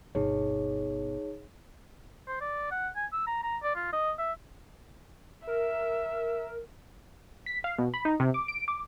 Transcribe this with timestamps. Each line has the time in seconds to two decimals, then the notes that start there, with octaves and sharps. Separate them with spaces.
0.15 G1 B2 D#4 G#4 C#5
2.28 C5
2.41 D5
2.72 F#5
2.96 G#5
3.13 E6
3.27 A#5
3.44 A#5
3.63 D5
3.75 F4
3.93 D#5
4.18 E5
5.47 A#4 E5
7.46 B6
7.64 F5
7.78 B2
7.94 B5
8.05 D#4
8.20 C3
8.34 D6
8.48 D7
8.68 D6